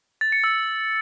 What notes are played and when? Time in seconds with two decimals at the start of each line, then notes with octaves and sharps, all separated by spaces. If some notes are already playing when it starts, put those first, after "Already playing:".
0.21 A6
0.32 C#7
0.44 E6